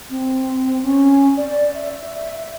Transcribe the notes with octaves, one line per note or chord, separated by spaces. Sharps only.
C4
C#4
D5
E5